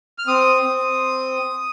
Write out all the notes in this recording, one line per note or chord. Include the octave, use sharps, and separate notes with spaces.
F6
C4 D#6
C4